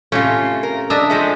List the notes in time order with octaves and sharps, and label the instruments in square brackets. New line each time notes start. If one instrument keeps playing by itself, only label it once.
[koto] A2 C3 C#4 [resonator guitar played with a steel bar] A3 F4
[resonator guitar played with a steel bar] A#4
[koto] D4 D#5 E5
[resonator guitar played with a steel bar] F3 G#3 A3